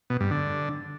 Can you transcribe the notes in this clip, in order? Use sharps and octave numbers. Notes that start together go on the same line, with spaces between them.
B2
G2
D3